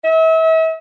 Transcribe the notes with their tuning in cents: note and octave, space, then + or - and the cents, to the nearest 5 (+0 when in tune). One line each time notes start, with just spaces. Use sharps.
E5 -40